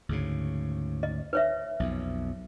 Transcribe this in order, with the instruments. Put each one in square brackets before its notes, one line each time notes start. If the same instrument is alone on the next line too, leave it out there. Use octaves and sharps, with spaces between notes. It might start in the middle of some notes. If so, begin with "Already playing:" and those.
[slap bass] D2 G#2 C#3
[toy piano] D#5
B4 C#5 E5
[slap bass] B1 F2